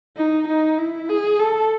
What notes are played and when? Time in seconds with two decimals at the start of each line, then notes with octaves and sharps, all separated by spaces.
0.18 D#4
0.48 D#4
0.79 E4
1.10 G#4
1.40 A4